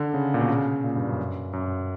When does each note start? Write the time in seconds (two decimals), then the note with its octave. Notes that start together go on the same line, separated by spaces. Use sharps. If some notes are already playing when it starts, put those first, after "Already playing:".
Already playing: D3
0.14 C#3
0.34 A#2
0.41 B2
0.50 C#3
0.84 A#2
0.96 G2
1.08 F#2
1.53 F#2